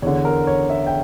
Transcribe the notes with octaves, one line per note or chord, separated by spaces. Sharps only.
E2 D3 C#5
A#4
C#5
E5
G5